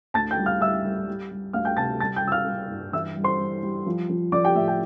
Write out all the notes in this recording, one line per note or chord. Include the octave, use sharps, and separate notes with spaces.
D2 A5 A6
G5 G6
G3
F5 F6
G3 E5 E6
G3
G3
G3
D2 F5 F6
G5 G6
C3 A5 A6
G3 A5 A6
G5 G6
G3 E6
F5 F6
G3
G2
E3 E5 E6
G3
C5 C6
G3
G3
F3
F3
F3 D5 D6
G4 G5
A2 E5
G4 G5